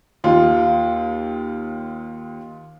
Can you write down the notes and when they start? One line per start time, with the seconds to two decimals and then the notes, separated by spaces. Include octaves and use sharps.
0.24 D#2 F4